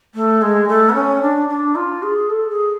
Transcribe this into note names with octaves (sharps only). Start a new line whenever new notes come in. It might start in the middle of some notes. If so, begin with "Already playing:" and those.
A3
G#3
A3
B3
C#4
D4
D4
F4
G#4
A4
G#4